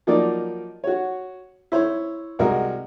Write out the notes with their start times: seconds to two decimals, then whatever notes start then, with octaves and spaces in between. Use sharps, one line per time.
0.07 F3 F#3 A#3 D#4 D5
0.84 F#4 C#5
1.72 E4 C5 C#5
2.39 C2 G#3 F#4 A#4